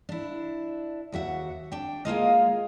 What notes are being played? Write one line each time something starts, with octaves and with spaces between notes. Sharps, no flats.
D4 E4
D#2 F#4 E5 F#5
D4 G5
G#3 A#3 F4 D#5